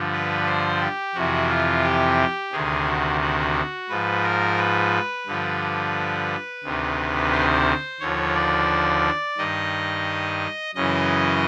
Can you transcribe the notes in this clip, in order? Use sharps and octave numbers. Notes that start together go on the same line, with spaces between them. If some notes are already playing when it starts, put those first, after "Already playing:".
Already playing: G2 D3 F3
B4
C5
G4
F2 C3 E3 F#4
F4
G4
D2 C3 D#3 G#4
F#4
F#4
G#2 F3 B4
A#4
B4
G2 D3 F3
D2 C3 D#3
C5
D#2 D3 F3 C#5
D5
G2 D#3 D#5
F#2 C#3 E3 D#5